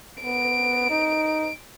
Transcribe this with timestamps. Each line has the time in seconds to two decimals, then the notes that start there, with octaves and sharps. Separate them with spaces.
0.22 B3 D7
0.90 D#4